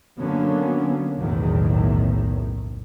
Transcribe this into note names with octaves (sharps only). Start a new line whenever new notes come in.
D3 F#3 A#3 B3 C#4
F#1 B1 E2 A2 D#3